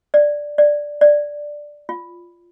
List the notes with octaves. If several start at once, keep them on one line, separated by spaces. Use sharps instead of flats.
D5
D5
D5
F4